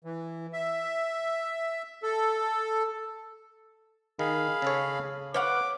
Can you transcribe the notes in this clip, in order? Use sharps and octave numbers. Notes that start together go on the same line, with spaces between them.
E3
E5
A4
D#3 G#4 F5 B5
C#3 A4 C#5
B4 C#5 F5 F#5 D6